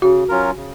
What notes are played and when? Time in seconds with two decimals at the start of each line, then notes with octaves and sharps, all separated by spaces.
0.02 C#3 F#4
0.29 F#3 C#4 F4 A#4
0.56 C#3